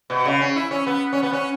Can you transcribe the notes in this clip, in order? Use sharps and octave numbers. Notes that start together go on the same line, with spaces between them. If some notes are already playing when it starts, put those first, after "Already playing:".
B2
C#3
C#4
E4
C#4
B3
C#4
B3
C#4